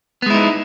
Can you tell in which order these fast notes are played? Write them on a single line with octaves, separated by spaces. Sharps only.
B3 G#3 E4 D#4